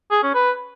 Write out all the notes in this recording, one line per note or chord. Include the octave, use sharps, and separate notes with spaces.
G#4
C#4
B4